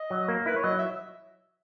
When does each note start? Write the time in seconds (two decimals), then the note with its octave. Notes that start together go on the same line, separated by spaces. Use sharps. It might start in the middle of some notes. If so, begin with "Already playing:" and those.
Already playing: D#5
0.10 F#3
0.28 A#3
0.46 E4 B4
0.56 C#5
0.64 F#3 D#5
0.78 E5